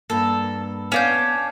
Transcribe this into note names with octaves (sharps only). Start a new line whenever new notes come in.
G2 A#3 A4
B3 C#4 D4 F5 G6